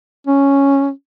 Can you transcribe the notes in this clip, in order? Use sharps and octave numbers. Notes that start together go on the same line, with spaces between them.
C#4